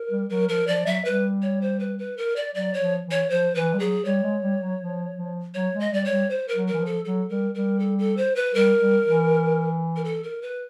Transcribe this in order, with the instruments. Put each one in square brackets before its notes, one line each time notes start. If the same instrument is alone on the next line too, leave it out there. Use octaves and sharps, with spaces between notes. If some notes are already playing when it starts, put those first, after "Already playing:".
Already playing: [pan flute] A#4
[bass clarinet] G3
[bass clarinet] F#3 [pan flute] A#4
[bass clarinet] F3 [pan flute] A#4
[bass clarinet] F3 [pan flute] D5
[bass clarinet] F#3 [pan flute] E5
[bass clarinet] G3 [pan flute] B4
[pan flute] C#5
C5
B4
B4
A#4
D5
[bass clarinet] F#3 [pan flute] D5
[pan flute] C#5
[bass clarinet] F3
E3
[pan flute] C#5
[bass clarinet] F3 [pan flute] C5
[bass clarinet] E3 [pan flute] B4
[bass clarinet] G3
[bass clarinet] F#3 [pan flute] G#4
[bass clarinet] G3 [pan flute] C#5
[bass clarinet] G#3
G3
F#3
F3
F3
[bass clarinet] F#3 [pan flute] C#5
[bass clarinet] G#3
[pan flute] D#5
[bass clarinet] G3 [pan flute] D5
[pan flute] C#5
[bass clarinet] G3
[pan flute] C5
A#4
[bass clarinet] F#3
[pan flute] A#4
[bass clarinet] E3
F3
[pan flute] A4
[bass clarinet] F#3 [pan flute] A4
[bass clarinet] G3 [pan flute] A#4
[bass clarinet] G3 [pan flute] A#4
[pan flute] A4
A4
C5
B4
[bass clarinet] G3 [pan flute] A#4
[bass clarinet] G3
E3
[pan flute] A#4
A4
A#4
B4